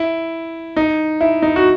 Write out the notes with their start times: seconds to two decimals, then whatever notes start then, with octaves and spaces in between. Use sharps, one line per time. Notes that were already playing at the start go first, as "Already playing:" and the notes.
Already playing: E4
0.77 D#4
1.21 E4
1.42 D#4
1.56 F#4